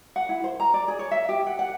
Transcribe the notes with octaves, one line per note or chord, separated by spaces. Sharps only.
F#5
E4
C5
A#5
D5
G#4
C#5
E5
G4
F#5
F#5